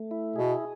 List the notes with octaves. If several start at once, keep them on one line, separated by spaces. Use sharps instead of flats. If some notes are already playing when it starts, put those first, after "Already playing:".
Already playing: A3
E4
B2 G#4